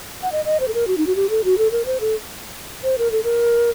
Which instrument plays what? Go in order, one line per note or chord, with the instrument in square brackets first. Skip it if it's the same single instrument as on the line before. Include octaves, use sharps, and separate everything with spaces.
[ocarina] F#5
D#5
D#5
C5
A4
A#4
F#4
D#4
F#4
G4
A4
F#4
A4
A#4
C5
A4
C5
A#4
A4
A#4